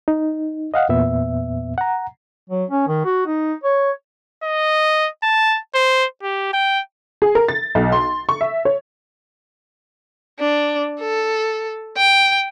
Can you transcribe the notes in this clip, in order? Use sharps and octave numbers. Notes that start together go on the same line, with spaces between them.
D#4
D#5 F5 F#5
E2 A#2 B3 E5
F#5 A#5
F#3
C#4
D#3
F#4
D#4
C#5
D#5
A5
C5
G4
G5
G#4
A#4
A6
B1
C6
C#6
E5
C#5
D4
A4
G5